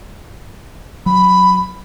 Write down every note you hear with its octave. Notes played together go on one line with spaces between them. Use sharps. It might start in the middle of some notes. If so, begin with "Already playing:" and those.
F#3 B5